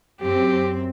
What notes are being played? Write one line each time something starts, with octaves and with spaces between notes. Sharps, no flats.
F#2 C4 G4